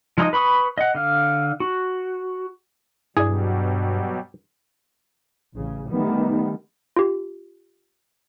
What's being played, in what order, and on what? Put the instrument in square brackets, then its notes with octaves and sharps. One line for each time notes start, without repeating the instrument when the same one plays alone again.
[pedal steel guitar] F3 G#3 D#4 D#5 D#6
B4 B5 C#6 D#6
D#5 F#5
D3 F5
F#4
[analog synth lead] G2 [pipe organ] B2 F#3 G3 [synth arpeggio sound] E4 D5 [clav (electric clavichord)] G#4
[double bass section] A1 C#3
D#3 G3 A3 B3
[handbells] F4 G4